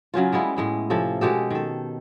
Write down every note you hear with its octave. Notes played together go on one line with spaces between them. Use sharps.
C#3 F#3 C#4 F4
G3 G#3 B3 E4
A2 G#3 E4
C3 F3 C#4 A4
B2 G#3 G4 A4
D#3 A4